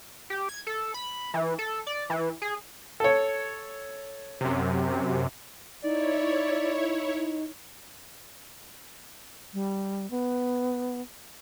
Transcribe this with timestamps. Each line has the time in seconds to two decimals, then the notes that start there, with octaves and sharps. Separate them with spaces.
0.30 G4
0.49 G#6
0.67 A4
0.94 B5
1.34 E3
1.59 A4
1.87 D5
2.10 E3
2.42 G#4
3.00 A4 C#5
4.41 F#2 C3
5.84 D#4 E4 C#5 D5
9.53 G3
10.11 B3